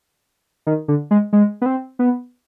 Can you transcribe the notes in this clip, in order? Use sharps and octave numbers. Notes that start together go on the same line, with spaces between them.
D#3
D3
G#3
G#3
B3
C4
B3